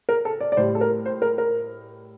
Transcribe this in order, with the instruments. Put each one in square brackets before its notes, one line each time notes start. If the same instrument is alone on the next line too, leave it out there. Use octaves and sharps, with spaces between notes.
[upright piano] A#4
A4
D5
D5
A2 G3 C5
A4
A#4
C5
A#4
A#4